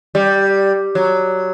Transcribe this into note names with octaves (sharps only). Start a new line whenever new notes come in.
G3
F#3